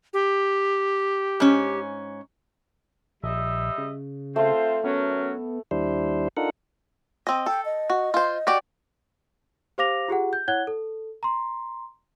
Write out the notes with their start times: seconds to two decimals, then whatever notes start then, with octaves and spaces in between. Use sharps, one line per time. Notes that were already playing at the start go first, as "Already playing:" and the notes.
0.13 G4
1.40 G#2 C#4
3.23 A#1 G3 D#5 E5
3.78 C#3
4.36 A3 C4 F4 C5
4.84 F#2 F#3 B3 C#4
5.71 D#2 G3 D4 E4 C5
6.37 D4 D#4 F4 A4 A#4 F#5
7.27 C4 D#5
7.46 A4 G5
7.65 D#5
7.90 F#4
8.14 F4 C5
8.47 F#4 G4 D5
9.78 G4 C5 F5 D6 A#6 F7
10.08 F4 G4 G#4 F#5
10.33 G6
10.48 E4 C#5 F#5 F#6 G#6 G7
10.67 A4
11.23 A#5 C6